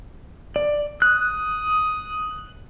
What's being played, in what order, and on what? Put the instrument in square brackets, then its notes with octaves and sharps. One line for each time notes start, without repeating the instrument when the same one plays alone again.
[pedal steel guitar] D5
[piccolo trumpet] D#6 [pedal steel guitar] F#6